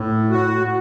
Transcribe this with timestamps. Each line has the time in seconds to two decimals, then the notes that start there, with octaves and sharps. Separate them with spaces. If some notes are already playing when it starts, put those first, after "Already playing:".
Already playing: A2
0.30 F#4